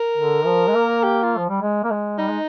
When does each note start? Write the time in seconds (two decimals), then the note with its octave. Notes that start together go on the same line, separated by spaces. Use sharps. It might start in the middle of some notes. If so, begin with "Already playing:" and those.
Already playing: A#4
0.17 D3
0.46 F3
0.68 G#3
0.75 A#3
1.04 G4
1.23 F4
1.37 F3
1.49 G3
1.62 G#3
1.84 A#3
1.91 G#3
2.19 G3 D#4
2.30 G#3